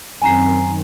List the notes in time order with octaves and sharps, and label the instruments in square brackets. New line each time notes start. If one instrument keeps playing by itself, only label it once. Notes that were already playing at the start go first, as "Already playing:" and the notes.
[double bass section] F#2 D#3 C4 [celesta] G#5 A#5 C7